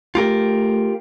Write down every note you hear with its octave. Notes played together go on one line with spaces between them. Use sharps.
A3 F4 G4 A#4